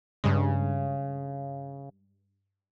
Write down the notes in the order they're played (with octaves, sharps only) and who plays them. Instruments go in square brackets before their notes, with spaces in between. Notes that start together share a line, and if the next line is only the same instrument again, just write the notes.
[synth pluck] G2 G#3 [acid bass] C#3